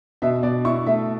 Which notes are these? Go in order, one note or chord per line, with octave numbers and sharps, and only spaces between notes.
B2 E5
B2 D5
E4 C#6
A3 E5